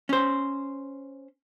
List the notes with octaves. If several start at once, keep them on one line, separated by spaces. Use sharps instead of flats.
C#4 C5